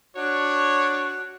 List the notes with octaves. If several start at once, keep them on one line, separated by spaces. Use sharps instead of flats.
D4 F#4 C#5